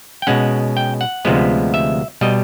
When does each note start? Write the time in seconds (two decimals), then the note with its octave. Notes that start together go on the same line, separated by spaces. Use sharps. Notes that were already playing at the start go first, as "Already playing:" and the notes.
0.22 G5
0.27 B2 G#3 C#4 F#5
0.77 G5
1.01 F#5
1.25 D2 C3 F3 G#3 B3
1.74 E5
2.21 B2 G3 D#5